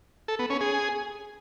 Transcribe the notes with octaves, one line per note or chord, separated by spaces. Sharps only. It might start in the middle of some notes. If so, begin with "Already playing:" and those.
A4
B3
C#4
G#4